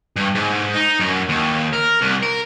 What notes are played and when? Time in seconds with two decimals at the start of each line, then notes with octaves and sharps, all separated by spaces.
0.16 G2
0.35 G#2
0.74 D#4
1.00 F#2
1.29 D#2
1.73 A#4
2.01 C2
2.22 A#4